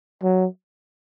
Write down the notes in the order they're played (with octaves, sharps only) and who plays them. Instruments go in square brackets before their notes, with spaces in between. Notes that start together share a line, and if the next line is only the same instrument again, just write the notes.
[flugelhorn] F#3